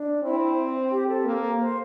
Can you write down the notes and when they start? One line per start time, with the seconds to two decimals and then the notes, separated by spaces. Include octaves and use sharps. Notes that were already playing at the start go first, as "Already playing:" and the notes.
Already playing: D4
0.23 C4 E4
0.91 G4
1.08 A4
1.24 A#3
1.59 C5